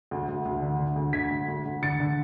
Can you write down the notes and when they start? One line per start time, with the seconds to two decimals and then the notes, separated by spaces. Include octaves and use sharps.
0.11 D2
0.29 D2
0.45 D2
0.62 D3
0.79 D3
0.96 D2
1.13 D3 G#6 B6
1.31 D2
1.48 D2
1.65 D2
1.82 D3 A6 C#7
2.00 D3